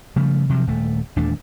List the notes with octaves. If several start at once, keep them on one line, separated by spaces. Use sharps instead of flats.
C#3 F3 G3 A3
C3 F3 F#3
D#1 A3
D#1 E2 A3 D4